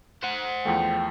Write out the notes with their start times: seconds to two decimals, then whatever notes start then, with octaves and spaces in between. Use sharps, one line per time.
0.23 C5 F#5
0.65 E2 F3 A3 G5